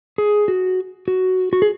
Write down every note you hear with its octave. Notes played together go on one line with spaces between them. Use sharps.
G#4
F#4
F#4
F#4
G#4